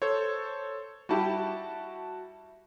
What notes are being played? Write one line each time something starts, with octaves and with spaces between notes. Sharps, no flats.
A4 C5 C#5
G3 E4 F#4 G4 A5